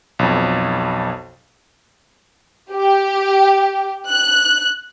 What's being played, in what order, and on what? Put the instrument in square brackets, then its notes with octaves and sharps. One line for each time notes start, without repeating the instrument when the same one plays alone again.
[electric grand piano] B1 F2
[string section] G4
F#6